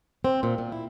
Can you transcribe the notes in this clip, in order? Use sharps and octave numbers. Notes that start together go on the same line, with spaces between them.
C4
A#2
A#2
E4